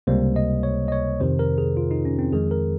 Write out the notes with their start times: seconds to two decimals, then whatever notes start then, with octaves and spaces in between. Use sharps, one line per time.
0.07 C#2 C3 G3 A#3 C5
0.36 D#5
0.63 C#5
0.88 D#5
0.92 C#5
1.20 F2 C3 D#3 C5
1.39 A#4
1.58 G#4
1.77 F4
1.91 D#4
2.05 C#4
2.19 C4
2.33 F2 D#3 G#3 G#4
2.51 A#4